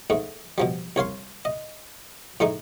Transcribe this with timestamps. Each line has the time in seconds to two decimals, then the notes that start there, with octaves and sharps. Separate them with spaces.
0.10 G#2 A3
0.58 B2 F3 G3
0.96 C2 C#5 F5 C6
1.45 D#5
2.40 A2 G#3 A3 D#4